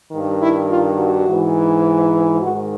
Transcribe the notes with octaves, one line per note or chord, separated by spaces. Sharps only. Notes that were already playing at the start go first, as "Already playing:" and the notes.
G2 D#3
E4
F4
F#4
G#2 E3
G#2 D#3 F#4